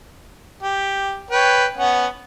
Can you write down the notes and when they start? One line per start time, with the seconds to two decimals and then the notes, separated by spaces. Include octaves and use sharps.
0.63 G4
1.30 B4 C#5 G5
1.77 B3 C#4 F#5